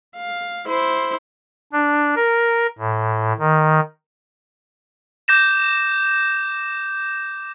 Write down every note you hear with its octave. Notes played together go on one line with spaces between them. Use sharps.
F5
E4 C5
D4
A#4
A2
D#3
D6 G6 A#6 E7